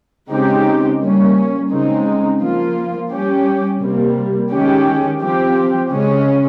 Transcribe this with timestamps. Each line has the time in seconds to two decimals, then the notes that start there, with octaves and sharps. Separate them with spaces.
0.29 C#3 G#3 C4 D#4 G4
1.00 G3 A#3 C#4
1.70 C#3 G#3 C4 D#4
2.40 F3 A#3 F4
3.11 G3 C#4 G4
3.80 C3 G3 A#3
4.51 D#3 G#3 C#4 G4
5.21 F3 C4 G4
5.91 C#3 G#3 C#4